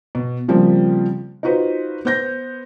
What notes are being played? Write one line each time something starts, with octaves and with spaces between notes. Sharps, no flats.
B2
C#3 F3 G3 A#3 C4
D#4 F4 F#4 B4 C5
B3 C5 G6 A#6